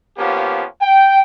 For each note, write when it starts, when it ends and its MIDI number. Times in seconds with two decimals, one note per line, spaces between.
0.18 0.65 53
0.18 0.65 58
0.18 0.65 59
0.18 0.65 61
0.18 0.65 67
0.81 1.21 79